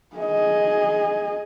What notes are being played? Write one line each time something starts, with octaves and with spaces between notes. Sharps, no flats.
G#4 D#5